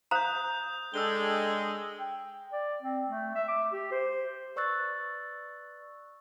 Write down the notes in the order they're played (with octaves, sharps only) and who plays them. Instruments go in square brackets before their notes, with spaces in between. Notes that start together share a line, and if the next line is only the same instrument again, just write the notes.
[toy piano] C5 F5 A#5 [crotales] D#6 G6
[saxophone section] G#3 [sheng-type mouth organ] D4 A4 G5 [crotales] E6 G7
[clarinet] G5
D5
C4
A3
E5
D6
G4
C5
[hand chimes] B4 D5 C#6 E6 F#6 A6